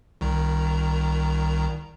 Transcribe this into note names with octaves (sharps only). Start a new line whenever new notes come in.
C2 D#3 A#5